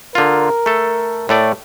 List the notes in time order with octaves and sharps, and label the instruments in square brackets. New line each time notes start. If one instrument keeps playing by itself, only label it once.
[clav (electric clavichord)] D3 F4 [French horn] A#4
[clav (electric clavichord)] A3 A4
A2 A3 D5